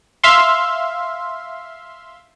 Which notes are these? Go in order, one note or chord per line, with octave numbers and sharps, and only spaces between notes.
E5 F5 C6